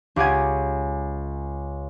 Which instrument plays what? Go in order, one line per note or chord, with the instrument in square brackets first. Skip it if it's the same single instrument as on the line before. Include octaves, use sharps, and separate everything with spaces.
[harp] C#2 G4 F#5 G#5 G#6